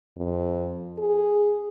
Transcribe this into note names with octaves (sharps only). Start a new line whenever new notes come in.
F2
G#4